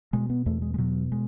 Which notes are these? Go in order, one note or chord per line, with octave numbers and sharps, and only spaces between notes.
B2 G#3
B3
E2 A3
G#3
G#3
B2 F#3
G#3